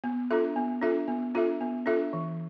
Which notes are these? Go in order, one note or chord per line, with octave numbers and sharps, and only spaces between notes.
B3
D4 F4 A4 E5
B3
D4 F4 A4 E5
B3
D4 F4 A4 E5
B3
D4 F4 A4 E5
E3